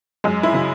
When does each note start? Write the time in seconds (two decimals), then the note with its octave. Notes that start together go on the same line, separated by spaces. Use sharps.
0.24 F#2 G#3
0.43 E4
0.53 C#3 F#3